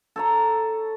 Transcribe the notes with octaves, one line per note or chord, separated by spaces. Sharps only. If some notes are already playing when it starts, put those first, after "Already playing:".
A4 C#5 A#5